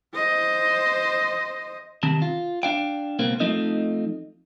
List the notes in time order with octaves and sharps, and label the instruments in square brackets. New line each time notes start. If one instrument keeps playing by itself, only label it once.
[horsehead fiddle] C5 D#5
[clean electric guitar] C3 D#3 C4 A5
F4
D4 F5 G5
C#2 B2 A#3 C4
F3 A3 C4 D#4 D#5